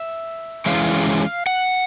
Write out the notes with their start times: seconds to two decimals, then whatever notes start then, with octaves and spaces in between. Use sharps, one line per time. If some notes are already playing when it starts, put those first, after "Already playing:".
Already playing: E5
0.66 E3 G#3 C#4 E4 F5
1.47 F#5